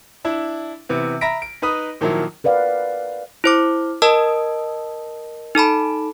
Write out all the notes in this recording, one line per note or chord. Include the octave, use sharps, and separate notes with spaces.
D4 E4
C3 E3 B3
E5 A#5 B5 A#6 B6 D7
D7
D#4 B4 B5 D#6
A#2 D#3 F3 F#3 E4
A#4 B4 D5 F5 F#5
E4 C5 D6
A#4 D#5 A5 D#6 E6
D#4 A4 A5 B5